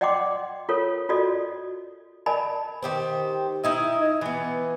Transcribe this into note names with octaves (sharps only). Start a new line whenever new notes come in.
D5 D#5 F#5 G5 C6 D6
F4 A4 A#4 C#5
F4 F#4 A4 D5 D#5
A#4 D5 D#5 G#5 A5 B5
D#3 G4 C5
D#4 E4 D#5
E3 B3